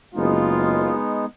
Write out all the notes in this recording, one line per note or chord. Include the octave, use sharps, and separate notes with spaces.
F#1 G#3 B3 D#4 F4